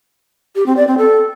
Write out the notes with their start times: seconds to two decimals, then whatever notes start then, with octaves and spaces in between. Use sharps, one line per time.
0.56 G4
0.66 C4
0.77 D5
0.87 C4
0.98 A4